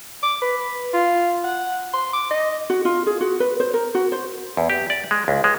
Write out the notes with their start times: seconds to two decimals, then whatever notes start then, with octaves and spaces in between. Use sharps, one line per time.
0.23 D6
0.42 B4
0.94 F4
1.44 F#5
1.94 C6
2.13 D6
2.31 D#5
2.70 F#4
2.85 F4
3.06 G#4
3.21 F#4
3.40 B4
3.60 C5
3.74 A#4
3.95 F#4
4.12 C5
4.57 E2
4.70 G4
4.90 D5
5.11 G#3
5.28 C#2
5.44 G#3